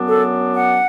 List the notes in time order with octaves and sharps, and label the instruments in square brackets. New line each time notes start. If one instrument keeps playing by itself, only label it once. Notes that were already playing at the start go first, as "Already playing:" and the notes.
Already playing: [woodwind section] F#2 F#3 B3 D4
A4
F#5